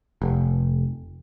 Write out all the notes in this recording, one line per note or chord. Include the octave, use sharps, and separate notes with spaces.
F1